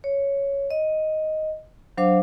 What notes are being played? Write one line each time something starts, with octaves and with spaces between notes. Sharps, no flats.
C#5
D#5
F#3 D4 C5 F5 D6